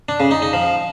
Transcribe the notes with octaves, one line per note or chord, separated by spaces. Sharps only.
D4
C#3
D#4
D#4
F3